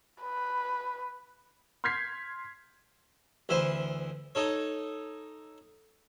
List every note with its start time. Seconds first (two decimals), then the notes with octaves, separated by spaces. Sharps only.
0.23 B4
1.84 C6 F6 G6 G#6 B6 C7
3.49 D2 E3 E4 C5
4.35 D#4 A4 C#5